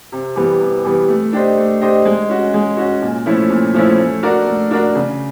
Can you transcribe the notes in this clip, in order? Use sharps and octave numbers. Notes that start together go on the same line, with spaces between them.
C3
E3 G3 B3
C3
E3 G3 B3
A3
D4 G4 C5 D#5
A3
D4 G4 C5 D#5
G#3
C#4 F#4
G#3
C#4 F#4
A#2
F3 A3 C#4 E4
A#2
F3 A3 C#4 E4
A3
D4 F#4 A#4 D5
A3
D4 F#4 A#4 D5
C#3